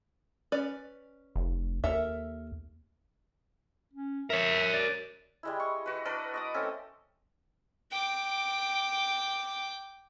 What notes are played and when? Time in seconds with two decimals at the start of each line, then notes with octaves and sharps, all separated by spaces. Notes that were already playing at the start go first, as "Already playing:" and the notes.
0.52 C#4 B4 D5
1.36 F1
1.84 D#2 A4 A#4 E5
3.93 C#4
4.30 A#4 C#5 E5
4.74 D5
5.43 G3 G#3 E4
5.60 C#6
5.86 F#4 B4
6.05 D4 A#4 B4 D5
6.34 D#5 D6 D#6
6.54 A3 C4 C#4 A4
7.92 G5 D6